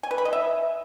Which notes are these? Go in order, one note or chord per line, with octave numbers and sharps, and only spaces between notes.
G#5
B4
B5
D#5
E5